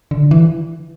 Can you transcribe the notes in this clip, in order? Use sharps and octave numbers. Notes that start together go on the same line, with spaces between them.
D3
E3